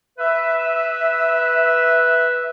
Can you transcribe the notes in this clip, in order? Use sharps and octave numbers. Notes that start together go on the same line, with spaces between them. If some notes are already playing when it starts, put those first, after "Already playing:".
B4 E5